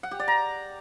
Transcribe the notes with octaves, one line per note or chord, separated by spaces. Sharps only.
F#5
G4
D5
A#5